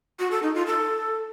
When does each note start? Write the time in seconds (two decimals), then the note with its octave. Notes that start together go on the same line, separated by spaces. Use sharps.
0.19 F#4
0.31 A4
0.43 D#4
0.54 F4
0.66 A4